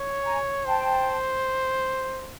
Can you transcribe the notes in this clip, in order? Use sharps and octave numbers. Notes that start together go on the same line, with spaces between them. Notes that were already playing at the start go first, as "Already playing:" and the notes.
Already playing: C#5
G#5 A#5
C5 G5 A5